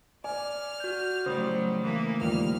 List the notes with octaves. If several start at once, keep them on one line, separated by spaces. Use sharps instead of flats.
D5 G#5 F6
F#4 G6
A2 C#3 F#3 G3 C5 D#6
E3 A#3
D#2 F3 G3 F6